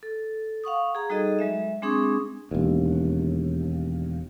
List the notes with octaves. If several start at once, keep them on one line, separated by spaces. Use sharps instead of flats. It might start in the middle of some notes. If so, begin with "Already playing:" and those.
A4
F5 F#5 C#6 D#6
G#4 A#5
G3 D#4 F#4 G#4 A4 D#5
F#3 G#3 E5
G#3 C4 D4 G#4 C#6 D#6
E1 D#2